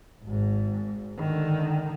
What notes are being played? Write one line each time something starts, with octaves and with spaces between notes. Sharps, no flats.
G#1 G#2
D3 D#3